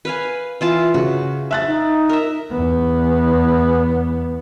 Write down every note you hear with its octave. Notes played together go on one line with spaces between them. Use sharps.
B4 F5 G#5
E3 F4 A5
C#3 F#4
E5 F#6 A6
D#4
A#4 E5
E2 B3